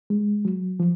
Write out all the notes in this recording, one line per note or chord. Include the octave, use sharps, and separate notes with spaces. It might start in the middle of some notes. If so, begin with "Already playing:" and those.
G#3
F#3
F3